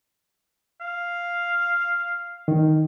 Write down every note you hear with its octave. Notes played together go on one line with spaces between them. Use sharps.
F5
D#3